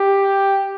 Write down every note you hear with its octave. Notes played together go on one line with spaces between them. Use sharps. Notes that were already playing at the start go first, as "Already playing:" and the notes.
Already playing: G4